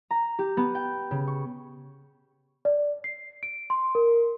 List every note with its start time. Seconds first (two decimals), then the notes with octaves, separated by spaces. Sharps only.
0.11 A#5
0.39 G4
0.57 B3
0.75 G5
1.11 C#3
1.28 C#6
2.65 D5
3.04 C7
3.43 D7
3.70 C6
3.95 A#4